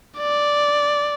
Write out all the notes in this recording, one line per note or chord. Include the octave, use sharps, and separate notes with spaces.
D5